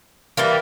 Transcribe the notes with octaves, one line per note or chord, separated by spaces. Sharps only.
E3 G3 A#3